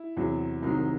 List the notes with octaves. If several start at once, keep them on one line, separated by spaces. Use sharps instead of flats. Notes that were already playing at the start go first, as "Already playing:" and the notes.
Already playing: E4
E2 C3 F#3
C2 C3 D#3 F#3 D#4